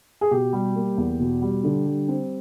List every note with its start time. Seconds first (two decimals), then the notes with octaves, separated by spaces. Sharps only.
0.21 G#4
0.31 B2 G4
0.53 G3
0.75 A#3
0.97 E2
1.19 B2
1.42 G3
1.64 D3
1.86 G3
2.08 C4